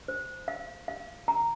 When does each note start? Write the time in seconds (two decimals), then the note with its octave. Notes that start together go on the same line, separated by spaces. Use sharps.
0.08 C5
0.48 F5
0.88 F5
1.28 A#5